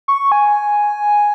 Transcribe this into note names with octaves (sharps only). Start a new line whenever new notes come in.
C#6
G#5